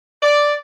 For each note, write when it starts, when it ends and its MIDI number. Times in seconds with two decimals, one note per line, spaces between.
0.22 0.54 74